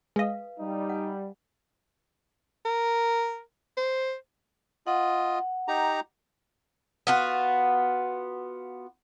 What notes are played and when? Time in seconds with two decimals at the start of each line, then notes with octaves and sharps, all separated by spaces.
0.16 G#3 B4 D#5 F5
0.59 G3 D#4
0.89 F#5 G#5
2.65 A#4
3.77 C5
4.87 F4 D#5 F#5
5.68 D#4 G4 A#5
7.07 B3 F4 F#4